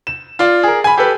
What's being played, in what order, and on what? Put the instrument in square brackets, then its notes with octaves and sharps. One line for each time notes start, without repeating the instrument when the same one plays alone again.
[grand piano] E7
F4 D5
G#4 A#4
G#5 B5
G4 A4 B4